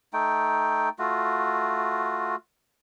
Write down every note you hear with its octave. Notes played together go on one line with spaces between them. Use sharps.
A3 D#4 G5
A3 F4 F#4